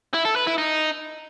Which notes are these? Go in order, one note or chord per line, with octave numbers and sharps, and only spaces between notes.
E4
A4
B4
E4
D#4